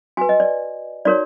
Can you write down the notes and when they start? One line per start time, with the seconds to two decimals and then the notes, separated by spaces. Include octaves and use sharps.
0.17 F#4 B4 G#5
0.29 D#5
0.40 D5
1.05 D#4 F#4 A#4 C#5 D5